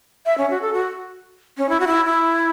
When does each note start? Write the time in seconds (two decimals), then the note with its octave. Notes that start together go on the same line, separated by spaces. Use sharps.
0.26 E5
0.38 C#4
0.50 F#4
0.61 A4
0.74 F#4
1.57 C#4
1.69 E4
1.80 F#4
1.87 E4
2.05 E4